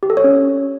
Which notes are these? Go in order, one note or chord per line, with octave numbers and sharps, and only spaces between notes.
G4
A4
C#5
C#4